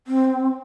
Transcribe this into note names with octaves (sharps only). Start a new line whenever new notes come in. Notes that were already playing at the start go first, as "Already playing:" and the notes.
C4